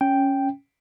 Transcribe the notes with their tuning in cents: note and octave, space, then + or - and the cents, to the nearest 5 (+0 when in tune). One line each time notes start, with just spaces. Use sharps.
C#4 +0 G5 +0